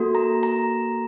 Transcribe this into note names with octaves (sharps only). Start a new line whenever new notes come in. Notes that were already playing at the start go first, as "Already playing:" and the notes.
Already playing: A#3 F#4 A4
A#5
A#5